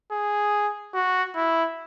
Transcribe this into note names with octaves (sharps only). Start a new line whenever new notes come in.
G#4
F#4
E4